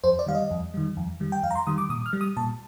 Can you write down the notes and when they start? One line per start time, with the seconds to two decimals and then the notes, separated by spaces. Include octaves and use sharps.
0.04 F2 C5
0.19 D5
0.26 D#3 G3 F5
0.35 D#5
0.51 F2
0.74 D#3 G3
0.97 F2
1.20 D#3 G3
1.32 G5
1.43 F2 F5
1.51 A#5
1.55 C6
1.67 D#3 G3 D#6
1.78 D6
1.89 A#2 D#6
2.06 F6
2.13 G3
2.21 D#6
2.37 A#2 A5